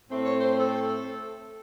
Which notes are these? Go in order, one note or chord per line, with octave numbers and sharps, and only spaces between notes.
A2 A3 C4
C#5
C5
A4